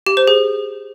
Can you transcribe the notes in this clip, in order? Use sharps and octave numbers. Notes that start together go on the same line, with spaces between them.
G4
C5
G#4